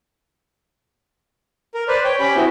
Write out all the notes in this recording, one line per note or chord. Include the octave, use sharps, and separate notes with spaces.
A#4
B4 C5 D5
C#5 G5
C#4 G4 G5 B5
B3 C4 E4 F#4